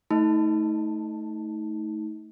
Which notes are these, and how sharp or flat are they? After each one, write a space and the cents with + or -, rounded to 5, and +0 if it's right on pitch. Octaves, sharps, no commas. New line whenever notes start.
A3 +0 D#4 +35 A5 +0